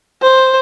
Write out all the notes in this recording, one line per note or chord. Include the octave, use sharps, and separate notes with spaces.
C5